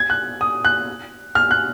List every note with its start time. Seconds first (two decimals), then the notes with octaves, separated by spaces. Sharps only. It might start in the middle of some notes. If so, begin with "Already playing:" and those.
Already playing: G#6
0.10 F#6
0.41 D#6
0.65 F#6
1.35 F6
1.51 F#6